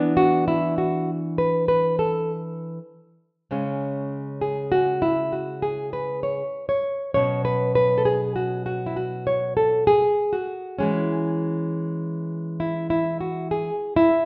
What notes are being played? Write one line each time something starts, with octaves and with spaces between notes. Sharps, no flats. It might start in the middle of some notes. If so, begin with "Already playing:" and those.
Already playing: E3 B3 D4
F#4
E4
F#4
B4
B4
A4
C#3 G#3 C#4
G#4
F#4
E4
F#4
G#4
B4
C#5
C#5
B2 F#3 C#4 C#5
B4
B4
A4
G#4
F#4
F#4
E4
F#4
C#5
A4
G#4
F#4
E3 G#3 C#4
E4
E4
F#4
G#4
E4